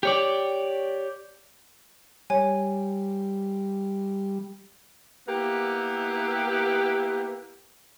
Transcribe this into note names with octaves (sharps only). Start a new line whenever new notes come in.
G4 C#5 D5
G3 C#5 G#5
A#3 B3 E4 G4